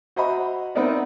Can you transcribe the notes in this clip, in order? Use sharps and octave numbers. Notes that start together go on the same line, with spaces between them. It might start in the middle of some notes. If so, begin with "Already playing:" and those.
F#4 C5 D#5 E5 A#5 B5
B3 C4 D#4 A#4 D5 E5